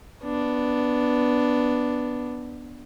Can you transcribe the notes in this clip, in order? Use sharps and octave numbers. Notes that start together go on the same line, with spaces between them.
B3 D4